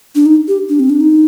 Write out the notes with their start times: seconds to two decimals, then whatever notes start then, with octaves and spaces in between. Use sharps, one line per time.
0.15 D4
0.26 D#4
0.48 G4
0.69 D4
0.80 C4
0.90 D4
1.01 D#4